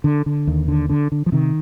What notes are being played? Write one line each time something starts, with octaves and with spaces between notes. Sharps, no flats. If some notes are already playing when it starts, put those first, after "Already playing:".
D3
D3
D#2
D3
D3
D3
F3
C3 D#3